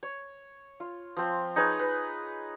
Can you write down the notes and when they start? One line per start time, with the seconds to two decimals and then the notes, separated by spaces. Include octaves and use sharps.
0.03 C#5
0.80 F4
1.17 F3 C4
1.56 D#4 G#4 B4 C#5
1.79 B4